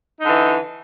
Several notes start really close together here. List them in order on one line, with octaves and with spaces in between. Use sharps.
D#4 D3 E3